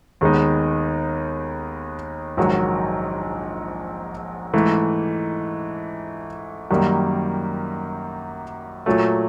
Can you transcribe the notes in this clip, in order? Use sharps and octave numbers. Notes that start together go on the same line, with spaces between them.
D#2 D#3 G#3 B3 D#4
A#1 G#2 D#3 F#3
G#2 E3 A3
F#2 D#3 G3 A#3
A#2 F#3 A3